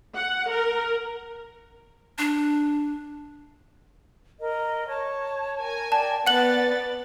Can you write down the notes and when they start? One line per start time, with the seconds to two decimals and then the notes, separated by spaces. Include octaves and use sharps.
0.15 F#5
0.50 A#4
2.18 D4
4.40 A#4 D#5
4.88 C#5 A5 C#6
5.59 A#4 G#5
5.92 D5 G5 A5
6.27 B3 B4 D5 F#5 F#6 A6 F#7